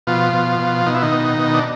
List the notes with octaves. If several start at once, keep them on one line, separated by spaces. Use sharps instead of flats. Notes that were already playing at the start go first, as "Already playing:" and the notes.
B2 F3 F4
B2
B2
B2 D#4
E4
D#3 D#4
B2
B2
D4